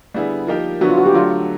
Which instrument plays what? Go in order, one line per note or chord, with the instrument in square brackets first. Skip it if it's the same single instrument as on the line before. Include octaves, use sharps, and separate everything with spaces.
[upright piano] D3 G3 B3 E4 G#4
F3 A#3 D#4 G4 A#4
[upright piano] D3 F#3 B3 E4 [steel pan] F#4
[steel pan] F4
F#4
G4
[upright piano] D3 F#3 A3 [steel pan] F4